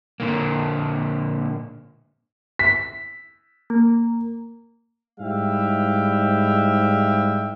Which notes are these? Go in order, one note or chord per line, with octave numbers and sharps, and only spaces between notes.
A#2 D3 A#3
B6
A#3
G#2 G3 E4 E5 F5 G5